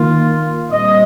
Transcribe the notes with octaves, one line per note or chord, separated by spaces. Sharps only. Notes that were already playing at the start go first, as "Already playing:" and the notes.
Already playing: D#3 A#3 F4
A#2 G3 C4 D#5